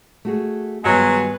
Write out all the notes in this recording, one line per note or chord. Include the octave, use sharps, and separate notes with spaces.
A3 F#4 G#4
G2 D#3 F#3 G#3 B3 B4 G#5